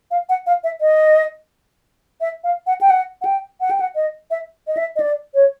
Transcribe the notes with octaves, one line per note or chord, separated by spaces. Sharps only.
F5
F#5
F5
E5
D#5
E5
F5
F#5
G5
F#5
F#5
G5
F#5
G5
F#5
D#5
E5
D#5
E5
D#5
D5
C#5